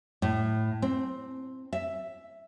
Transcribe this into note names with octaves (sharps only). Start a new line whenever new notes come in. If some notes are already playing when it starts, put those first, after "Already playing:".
A2
C4
E5